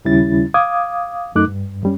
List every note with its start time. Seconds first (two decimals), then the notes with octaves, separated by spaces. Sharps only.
0.05 D#2 C#3 G3 C#4 E4 A6
0.54 F5 D6 D#6 G#6
1.35 F#2 A3 D#4 D6 F#6
1.48 G2
1.83 F#2 G3 C#4